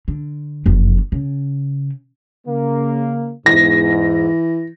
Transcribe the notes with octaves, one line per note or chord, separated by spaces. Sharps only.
D3
F#1 F2
C#3
C#3 A#3
E2 G#2 E3 A#6